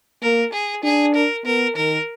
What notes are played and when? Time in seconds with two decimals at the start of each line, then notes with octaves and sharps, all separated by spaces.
0.22 A#3 A#4
0.53 G#4
0.84 D4 G#4
1.15 A#4
1.45 B3 A#4
1.76 D#3 A#4